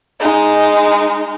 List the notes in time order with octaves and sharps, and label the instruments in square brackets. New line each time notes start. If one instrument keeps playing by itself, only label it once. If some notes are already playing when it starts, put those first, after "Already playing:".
[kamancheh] G#3 D#4